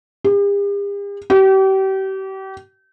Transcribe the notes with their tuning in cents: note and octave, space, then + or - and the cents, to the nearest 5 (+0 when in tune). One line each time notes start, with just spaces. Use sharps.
G4 +45
G4 -35